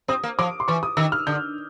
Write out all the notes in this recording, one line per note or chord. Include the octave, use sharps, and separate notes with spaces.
C4 D#6
A#3
F3 D6
C6
E3 C#6
D#6
D#3 E6
F6
D3 G6